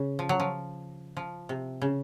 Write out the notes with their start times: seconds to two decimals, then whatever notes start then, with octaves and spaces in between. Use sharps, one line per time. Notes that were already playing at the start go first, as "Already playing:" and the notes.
Already playing: C#3
0.19 F3
0.29 F#3
0.40 F3
1.17 F3
1.49 C3
1.82 C#3